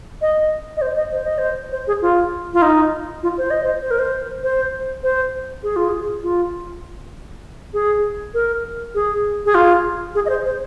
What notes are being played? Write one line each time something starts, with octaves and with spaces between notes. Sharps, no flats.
D#5
D#5
C5
D#5
C5
D#5
C5
C5
G#4
F4
F4
D#4
F4
C5
D#5
C5
C5
A#4
C5
C5
C5
G#4
F4
G#4
F4
G#4
A#4
G#4
G#4
F4
G#4
D#5
C5
C5